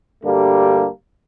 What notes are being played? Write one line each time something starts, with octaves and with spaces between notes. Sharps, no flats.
D2 G2 G3 A3 A#3 D4